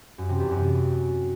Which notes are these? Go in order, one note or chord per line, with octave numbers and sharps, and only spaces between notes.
F#2
C3
E2
F#2